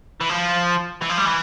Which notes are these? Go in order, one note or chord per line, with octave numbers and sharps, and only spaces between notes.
E3
F3
E3
F3
G3
E3